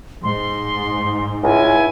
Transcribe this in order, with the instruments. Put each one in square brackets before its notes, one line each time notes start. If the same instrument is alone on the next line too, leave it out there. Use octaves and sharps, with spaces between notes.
[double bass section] G#2 [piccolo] C6
[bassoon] C#2 [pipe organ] E4 [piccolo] G#5